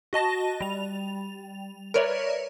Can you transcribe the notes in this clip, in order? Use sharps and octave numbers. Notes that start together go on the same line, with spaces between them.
F#4 D#5 A5 A#6
G3 F7
A#4 B4 C#5 D5 E5